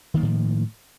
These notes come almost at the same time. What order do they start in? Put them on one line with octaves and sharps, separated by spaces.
D#3 A#3 F3 A2